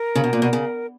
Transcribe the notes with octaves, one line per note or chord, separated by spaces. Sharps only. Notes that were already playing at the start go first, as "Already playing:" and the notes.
Already playing: A#4
C#3
B2
A#2
B2
C#3